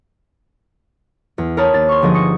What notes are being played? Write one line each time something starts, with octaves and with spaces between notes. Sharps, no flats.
E2
A#4 C5 C#5 A5 B5 D#6
D#2 A6
C6 C#6
G1 F3 G#4 D#5
C#6 D#6 A#6 C#7